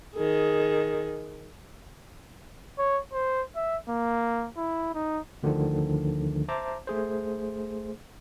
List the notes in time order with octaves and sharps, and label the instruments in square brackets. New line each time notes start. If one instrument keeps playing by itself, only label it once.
[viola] D#3 G#4
[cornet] C#5
C5
E5
A#3
E4
D#4
[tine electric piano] D2 D3 D#3 F3 D4
C5 E5 A5 A#5 D6
A3 G#4 C5